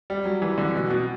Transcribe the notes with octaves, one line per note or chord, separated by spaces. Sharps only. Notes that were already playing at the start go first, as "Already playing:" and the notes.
G3
F#3
E3
D3
B2
B2